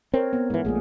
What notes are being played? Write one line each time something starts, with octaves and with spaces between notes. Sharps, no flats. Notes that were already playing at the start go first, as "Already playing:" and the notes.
C4 A#4 C#5
B3
G#2 E3 G#3
A#1 A#2 A3 G#4